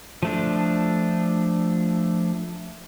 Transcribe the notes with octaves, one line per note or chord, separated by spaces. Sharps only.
F3 A3 D4